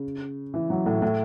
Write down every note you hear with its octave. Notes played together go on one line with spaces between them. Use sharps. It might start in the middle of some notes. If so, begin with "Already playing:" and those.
Already playing: C#3
E3
F#3
A2
A2